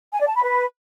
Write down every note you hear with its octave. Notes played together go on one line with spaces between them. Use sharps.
G#5
D5
A5
B5
B4